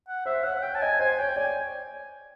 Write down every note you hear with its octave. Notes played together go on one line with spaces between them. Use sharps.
F#5
C5 E5
C#5 F#5
C#5 G5
A5
D#5 G#5
C5 G#5
C#5 G5
D5 G#5